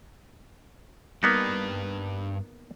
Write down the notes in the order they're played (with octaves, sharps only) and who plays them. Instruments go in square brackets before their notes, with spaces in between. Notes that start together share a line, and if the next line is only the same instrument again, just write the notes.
[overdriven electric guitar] G2 B4 [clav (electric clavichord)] A#3 B3 D#4